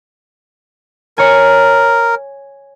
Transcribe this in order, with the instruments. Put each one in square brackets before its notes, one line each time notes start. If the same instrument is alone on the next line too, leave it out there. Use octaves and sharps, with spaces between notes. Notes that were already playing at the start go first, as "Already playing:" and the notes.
[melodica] A#4 [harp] C#5 G#5